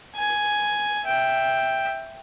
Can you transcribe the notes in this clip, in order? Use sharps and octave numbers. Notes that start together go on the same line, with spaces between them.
G#5
E5 G5